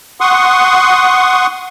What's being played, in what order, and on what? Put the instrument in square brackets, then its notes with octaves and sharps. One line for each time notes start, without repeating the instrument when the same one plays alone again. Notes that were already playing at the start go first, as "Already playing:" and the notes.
[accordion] F#5 C6 C#6 D#6